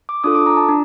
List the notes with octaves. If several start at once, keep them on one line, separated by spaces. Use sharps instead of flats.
D6
D4 F4 A4 D#6
D6
A#5
A5
D4